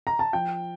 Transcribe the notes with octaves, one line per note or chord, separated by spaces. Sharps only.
A#5
A5
F3 G5